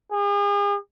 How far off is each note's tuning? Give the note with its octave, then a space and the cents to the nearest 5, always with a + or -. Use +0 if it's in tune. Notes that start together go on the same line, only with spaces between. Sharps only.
G#4 -40